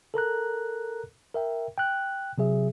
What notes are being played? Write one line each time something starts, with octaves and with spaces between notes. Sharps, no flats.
A4 A#4 A#5 F#6
A#4 E5 G5
G5 F#6
C3 F#3 G#4 E5